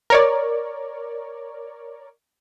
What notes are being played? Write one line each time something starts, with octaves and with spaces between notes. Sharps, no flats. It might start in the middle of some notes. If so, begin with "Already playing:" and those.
A#4 C#5 D5